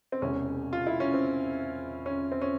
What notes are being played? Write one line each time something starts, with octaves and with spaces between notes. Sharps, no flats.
C4
E1 E2 C3 C#4
F4
E4
C#4
C4
C#4
C4
C#4